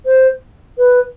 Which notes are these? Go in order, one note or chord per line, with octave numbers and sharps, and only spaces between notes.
C5
B4